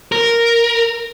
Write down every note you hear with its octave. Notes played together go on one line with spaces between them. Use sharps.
A#4